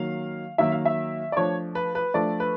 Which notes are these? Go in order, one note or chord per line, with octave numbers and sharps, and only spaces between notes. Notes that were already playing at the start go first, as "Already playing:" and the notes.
Already playing: D#3 F#3 A#3 F5
D#3 F#3 A#3 E5
F5
E5
D5
F3 A3 D4 C#5
B4
B4
F3 A3 D4 D5
B4